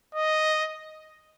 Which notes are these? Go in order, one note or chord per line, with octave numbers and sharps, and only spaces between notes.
D#5